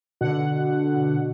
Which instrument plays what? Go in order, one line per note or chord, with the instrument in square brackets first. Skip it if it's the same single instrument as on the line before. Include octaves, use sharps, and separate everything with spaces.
[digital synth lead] B2 [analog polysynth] D3 F#5